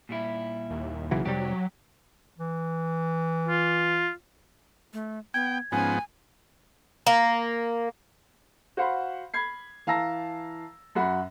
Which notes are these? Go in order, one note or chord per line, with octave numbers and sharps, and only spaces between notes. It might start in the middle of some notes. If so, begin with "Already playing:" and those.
A#2 G3 E4
D#2
B1 C#3 E3 F#3
F1 C3 F#3 G3 G4
E3
F4
A3
B3 G5 G#6
G#2 F3 B3 C#4 G#5
A#3
F#4 C5 F5 F#5 B5 C6
B5 G#6 C7
E3 F5 A5 A#5 E6 A#6
F#2 F#4 B5